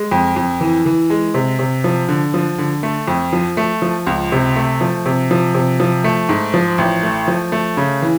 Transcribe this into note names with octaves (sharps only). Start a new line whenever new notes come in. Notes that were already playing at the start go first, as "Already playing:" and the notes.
Already playing: G#3
F2
F2
E3
E3
G#3
C3
C3
F3
D3
F3
D3
A3
F2
F3
A3
F3
C#2
C3
A3
F3
C3
F3
C3
F3
A3
G#2
F3
A1
A3
F3
A3
C#3
E3